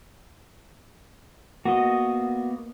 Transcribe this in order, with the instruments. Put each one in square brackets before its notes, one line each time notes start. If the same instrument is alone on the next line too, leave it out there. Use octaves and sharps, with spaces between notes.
[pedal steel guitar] A#3 B3 D#5 [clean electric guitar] F#4